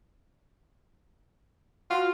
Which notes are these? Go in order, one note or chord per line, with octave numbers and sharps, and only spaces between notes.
F4 F#4